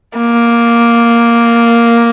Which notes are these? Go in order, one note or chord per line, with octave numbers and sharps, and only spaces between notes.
A#3